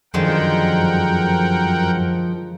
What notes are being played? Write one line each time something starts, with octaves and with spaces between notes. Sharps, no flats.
F#2 D3 D#3 F3 G#3 A#4 F#5 G5